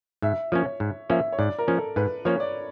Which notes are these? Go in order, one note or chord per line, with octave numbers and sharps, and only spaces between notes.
G#2 E5
F3 A#3 C#4 C#5
G#2
F3 A#3 C#4 E5
C#5
G#2 D5
A#4
F3 A#3 C#4
A4
G#2 B4
F3 A#3 C#4 C#5
D5